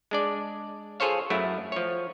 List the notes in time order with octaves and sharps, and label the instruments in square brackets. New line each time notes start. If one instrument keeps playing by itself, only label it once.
[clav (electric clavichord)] G#3 D4 D5
F4 G#4 A4 C5 C#5 F5
F#2 F#3 A3 E4
F3 C#5